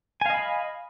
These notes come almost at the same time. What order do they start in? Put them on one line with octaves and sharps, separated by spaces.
G#5 F5 D#5 B5